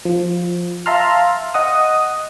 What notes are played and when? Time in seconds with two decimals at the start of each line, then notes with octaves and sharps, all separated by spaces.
0.05 F3
0.86 E5 F5 A5 A#5 C6 F6
1.54 D#5 F#5 D#6